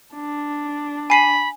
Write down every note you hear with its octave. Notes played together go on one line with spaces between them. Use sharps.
D4
G#5 B5 C7 D#7